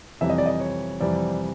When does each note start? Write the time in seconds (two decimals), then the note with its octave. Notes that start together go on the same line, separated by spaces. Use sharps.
0.21 F2 C3 E3 G3 E5
0.30 D#5
0.38 D5
0.46 D#5
0.60 C#5
1.01 F2 C3 E3 G3 D5